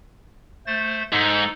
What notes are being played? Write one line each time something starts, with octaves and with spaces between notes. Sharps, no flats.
A3 C5 A6
G#2 D#4 A4